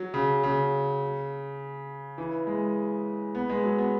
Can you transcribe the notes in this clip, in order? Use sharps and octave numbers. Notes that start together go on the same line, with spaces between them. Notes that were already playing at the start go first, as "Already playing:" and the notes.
Already playing: F#3
C#3
C#3
E3
G#3
B3
G#3
F#3
B3